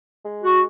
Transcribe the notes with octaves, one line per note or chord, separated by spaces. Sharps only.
G#3
F#4